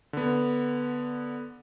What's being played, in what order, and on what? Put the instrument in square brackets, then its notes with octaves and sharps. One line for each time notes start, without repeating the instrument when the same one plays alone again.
[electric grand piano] D3 B3